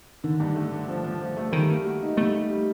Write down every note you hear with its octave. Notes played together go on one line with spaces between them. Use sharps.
D3 D#3
G2
A3
D3
F3
F3
F3
A3
D#3 G3
A#3
F#4
D#4
G3 A3
G3
G3